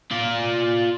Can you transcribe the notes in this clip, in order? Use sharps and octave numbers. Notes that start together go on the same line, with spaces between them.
F4 D5